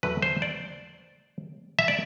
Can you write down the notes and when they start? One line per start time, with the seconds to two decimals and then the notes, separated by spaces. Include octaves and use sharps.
0.03 E2 D3 F#3 A3 B4
0.22 C5
0.42 D5
1.79 E5
1.88 D5